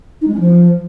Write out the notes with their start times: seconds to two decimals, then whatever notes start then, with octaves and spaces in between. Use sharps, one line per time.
0.21 D#4
0.27 G#3
0.33 C#4
0.39 F3